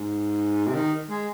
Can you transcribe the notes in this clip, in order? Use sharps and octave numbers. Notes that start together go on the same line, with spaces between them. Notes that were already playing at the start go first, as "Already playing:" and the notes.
Already playing: G#2
C3
D#3
G#3